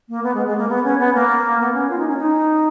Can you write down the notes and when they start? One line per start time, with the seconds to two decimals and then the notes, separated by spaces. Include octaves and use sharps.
0.09 A#3
0.23 B3
0.34 G#3
0.46 G#3
0.58 A#3
0.69 B3
0.84 C#4
0.99 B3
1.14 A#3
1.60 B3
1.74 C#4
1.90 F4
1.98 D#4
2.08 C#4
2.17 D#4